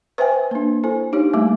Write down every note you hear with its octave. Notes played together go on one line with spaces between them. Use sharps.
B4 C5 E5 G5 G#5
A#3 D4
E4 A4 C5 G#5
D4 D#4 G4 C#5
G3 A3 A#3 E5 D6